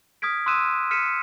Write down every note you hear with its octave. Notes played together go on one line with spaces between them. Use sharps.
D#6 F6 G#6 B6 D7
C6 D#6 E6 F#6 D#7 E7
F6 B6 C#7 D#7 E7